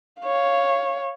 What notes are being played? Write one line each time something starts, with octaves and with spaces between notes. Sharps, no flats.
C#5 F5